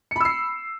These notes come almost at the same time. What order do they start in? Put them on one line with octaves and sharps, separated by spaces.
C#7 B5 E6 C7